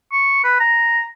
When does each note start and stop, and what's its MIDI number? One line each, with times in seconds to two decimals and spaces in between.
0.13 0.41 85
0.44 0.58 71
0.60 1.07 82